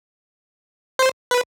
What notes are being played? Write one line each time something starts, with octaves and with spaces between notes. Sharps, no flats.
C5
B4